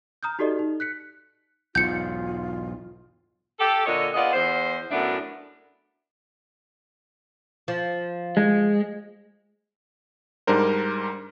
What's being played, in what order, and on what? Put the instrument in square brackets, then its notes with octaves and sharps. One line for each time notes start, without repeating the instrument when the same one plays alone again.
[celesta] A#5 D#6 F6 G6
D#4 F#4 G4 A4 D5 D#5
D#4
F#6 B6 C#7
[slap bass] B1 E2 G#2 [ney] F4 [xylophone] G6 C#7
[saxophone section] G4 A4
A#2 D3 C#5 D#5
B3 F4 G#4 D5 D#5
E2 C5
F#2 A2 B3 D4 E5
[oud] F3
[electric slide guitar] G#3
[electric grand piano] G#2 G3 D4 A#4 C5